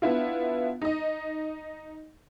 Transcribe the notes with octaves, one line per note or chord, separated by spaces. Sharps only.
B3 D4 E4 F4
D#4 D#5